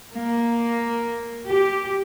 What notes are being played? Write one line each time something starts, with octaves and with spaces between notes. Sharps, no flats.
A#3
G4